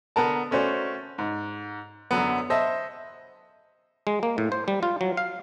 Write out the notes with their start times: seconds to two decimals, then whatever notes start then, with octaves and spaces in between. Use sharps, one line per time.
0.16 D3 B3 A#4 A5
0.51 A3 C#4 F#4 C5 D5
1.18 G#2
2.11 F#2 D3 F#3 B3
2.50 C5 D#5 E5 A5
4.07 G#3
4.23 A#3
4.38 A2
4.52 C5
4.68 G3
4.83 F4
5.01 F#3
5.17 F5